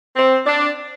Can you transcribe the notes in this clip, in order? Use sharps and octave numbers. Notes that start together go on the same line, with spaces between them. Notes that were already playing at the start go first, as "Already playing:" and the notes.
C4
D4